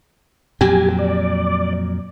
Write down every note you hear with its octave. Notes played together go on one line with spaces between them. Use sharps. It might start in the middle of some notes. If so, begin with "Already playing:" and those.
F2 A#2 F#3 G4 G#5
D5